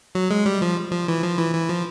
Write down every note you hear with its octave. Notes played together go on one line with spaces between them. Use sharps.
F#3
G#3
G3
F3
F3
E3
F3
E3
E3
F3